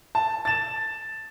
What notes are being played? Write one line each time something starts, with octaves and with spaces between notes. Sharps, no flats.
A5
A6 E7